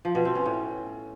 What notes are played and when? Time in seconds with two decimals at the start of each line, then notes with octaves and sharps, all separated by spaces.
0.05 F3
0.15 B2
0.25 C4
0.35 C#4
0.46 A2